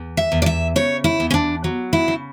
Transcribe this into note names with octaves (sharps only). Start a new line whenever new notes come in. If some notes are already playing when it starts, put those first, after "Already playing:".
Already playing: E2
E5
E2
D5
E5
C#3 C#5
E4
E2
C#4
D4
F#3
E4
C#3